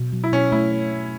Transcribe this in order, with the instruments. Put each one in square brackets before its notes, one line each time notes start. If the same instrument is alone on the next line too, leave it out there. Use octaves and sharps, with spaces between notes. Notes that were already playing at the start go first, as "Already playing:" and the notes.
Already playing: [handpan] B2
F#3
[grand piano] E4
[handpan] B2 [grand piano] C#4
[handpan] A3 [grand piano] E4
[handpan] C#5
A3